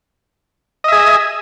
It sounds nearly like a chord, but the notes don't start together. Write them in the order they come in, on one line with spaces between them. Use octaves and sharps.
D#5 E5 G#4